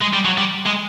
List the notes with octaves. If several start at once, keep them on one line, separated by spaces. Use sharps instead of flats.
G#3
G3
F#3
G3
G#3